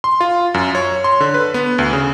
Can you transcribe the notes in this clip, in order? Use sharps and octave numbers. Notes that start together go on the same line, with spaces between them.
C6
F4
F#2
C#5
C6
D3
B4
B3
D2
C#3